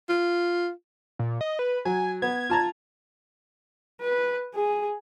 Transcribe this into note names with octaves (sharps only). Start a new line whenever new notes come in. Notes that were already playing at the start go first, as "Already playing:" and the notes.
F4
A#2
D#5
B4
F#3 G#5
B3 G#6
F4 A5 A#5
B4
G#4